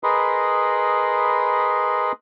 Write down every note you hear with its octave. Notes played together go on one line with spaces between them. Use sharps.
G#4 A#4 B4 D#5 B5 C6